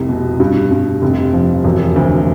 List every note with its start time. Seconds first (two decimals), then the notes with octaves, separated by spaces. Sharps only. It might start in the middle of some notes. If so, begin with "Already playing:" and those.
Already playing: F1 C2
0.09 B2
0.40 G2
0.71 G2
1.02 F1
1.33 F3
1.64 E1
1.96 D2